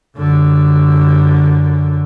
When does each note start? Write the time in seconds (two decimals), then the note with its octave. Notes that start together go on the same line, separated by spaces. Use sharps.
0.17 F#2 D3